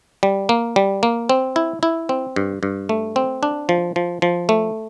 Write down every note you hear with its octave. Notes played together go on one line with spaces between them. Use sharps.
G3
A#3
G3
A#3
C4
E4
E4
C4
G2
G2
A3
C4
D4
F3
F3
F3
A3